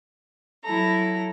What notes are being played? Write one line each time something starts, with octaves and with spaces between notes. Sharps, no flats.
F#3 E4 A4 A#5